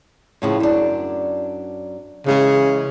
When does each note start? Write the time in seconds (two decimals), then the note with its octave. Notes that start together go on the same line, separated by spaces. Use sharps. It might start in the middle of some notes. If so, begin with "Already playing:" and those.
0.42 A2 C#3 F3
0.60 F#2 D4
2.26 C#3 E3 G#3 G#4